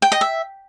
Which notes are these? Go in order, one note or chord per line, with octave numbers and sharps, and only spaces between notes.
G5
D#5
E5